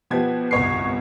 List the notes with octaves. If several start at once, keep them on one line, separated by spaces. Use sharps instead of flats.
B2 F3 B3 G4 G#6
G1 C2 B2 C#5 D#5 C7